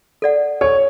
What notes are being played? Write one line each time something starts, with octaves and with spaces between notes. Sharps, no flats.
A4 D5 F#5
A4 C#5